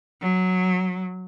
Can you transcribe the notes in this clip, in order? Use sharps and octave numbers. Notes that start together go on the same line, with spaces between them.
F#3